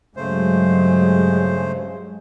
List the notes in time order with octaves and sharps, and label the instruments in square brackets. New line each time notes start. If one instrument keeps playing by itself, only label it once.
[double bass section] G2 F#3 G#3 [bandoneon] C#3 A3 C5